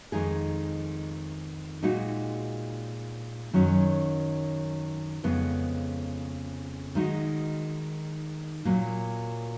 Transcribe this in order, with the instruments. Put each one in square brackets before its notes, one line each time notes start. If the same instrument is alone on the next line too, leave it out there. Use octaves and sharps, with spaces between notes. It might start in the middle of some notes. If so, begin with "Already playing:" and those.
[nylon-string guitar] F2 D#3 G#3 D#4 G#4
A#2 G#3 D#4 F#4
F#2 D#3 F#3 C#4
F2 C#3 G#3 B3
D#3 G#3 D#4 F#4
A#2 F#3 A#3